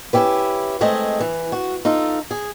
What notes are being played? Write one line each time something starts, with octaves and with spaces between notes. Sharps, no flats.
C#4 E4 G4 B4
G#3 A3 C4 G#4 D#5
E3
F#4
D#4 F4 A4
G#4